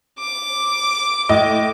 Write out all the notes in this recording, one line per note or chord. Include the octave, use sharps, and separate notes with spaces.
D6
A2 D#5